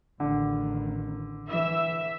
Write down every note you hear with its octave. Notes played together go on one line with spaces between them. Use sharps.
A1 D3 D#3
E3 E5